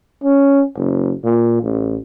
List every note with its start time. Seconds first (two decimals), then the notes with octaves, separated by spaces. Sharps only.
0.23 C#4
0.76 F#1
1.24 A#2
1.62 A1